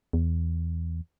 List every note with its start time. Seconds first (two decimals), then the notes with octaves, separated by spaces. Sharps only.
0.13 E2